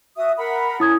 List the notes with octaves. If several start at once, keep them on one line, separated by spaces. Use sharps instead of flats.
F#4 E5 D#6
A#4 F#5 B5
C#4 E4 D#6 G#6